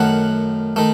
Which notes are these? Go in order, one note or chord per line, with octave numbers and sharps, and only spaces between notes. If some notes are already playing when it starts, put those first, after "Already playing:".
Already playing: F#2 D#3 A3 F#5
D#3 A3